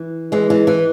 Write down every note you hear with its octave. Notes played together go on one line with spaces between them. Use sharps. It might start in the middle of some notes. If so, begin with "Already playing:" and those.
Already playing: E3
E3 G#3
E3 G#3
E3